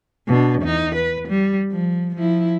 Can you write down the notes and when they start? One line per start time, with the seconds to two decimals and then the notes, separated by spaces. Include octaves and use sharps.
0.28 B2 D4
0.62 E2 D#4
0.95 B4
1.28 G3
1.72 F3
2.15 F3 E4